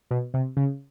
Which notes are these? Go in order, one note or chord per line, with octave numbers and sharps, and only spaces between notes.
B2
C3
C#3